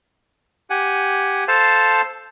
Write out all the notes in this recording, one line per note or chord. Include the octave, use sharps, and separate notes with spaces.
G4 F#5 G#5
A4 C5 F5 A5